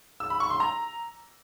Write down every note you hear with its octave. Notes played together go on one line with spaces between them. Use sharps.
E6
B5
C#6
C6
A#5